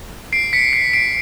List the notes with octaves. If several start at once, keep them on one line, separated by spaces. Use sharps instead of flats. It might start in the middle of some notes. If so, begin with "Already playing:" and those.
C7 D7
B6 C#7
C7
C7 D7